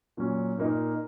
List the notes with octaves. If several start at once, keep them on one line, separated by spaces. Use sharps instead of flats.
A#2 F#3 C#4
A#2 A#3 D#4